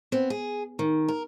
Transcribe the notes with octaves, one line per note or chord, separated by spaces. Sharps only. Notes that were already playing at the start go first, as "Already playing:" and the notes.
B3 C4
G#4
D#3
A#4